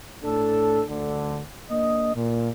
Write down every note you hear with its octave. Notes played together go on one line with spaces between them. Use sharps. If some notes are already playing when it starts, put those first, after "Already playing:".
A2 D4 A4
D2 D3
A#3 D4 D#5
A#2